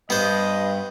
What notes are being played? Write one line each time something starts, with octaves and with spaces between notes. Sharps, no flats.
G2 B3 C5 D#5